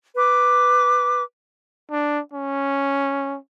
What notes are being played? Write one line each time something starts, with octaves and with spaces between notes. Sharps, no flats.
B4 D6
D4
C#4